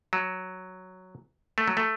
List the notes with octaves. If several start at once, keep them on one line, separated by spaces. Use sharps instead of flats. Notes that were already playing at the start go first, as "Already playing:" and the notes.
F#3
A3
F#3
A3